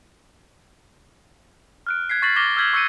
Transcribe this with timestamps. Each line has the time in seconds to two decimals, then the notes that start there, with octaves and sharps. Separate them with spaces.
1.87 F6 F#6 D7
2.10 F#6 G#6 B6 C7
2.22 C#6 A6 B6 C7 F#7
2.36 C#6 D6 F6 A6 A#6 G7
2.57 E6 F6 G6 G#6 B6 F#7
2.73 C#6 E6 G6 C#7 D#7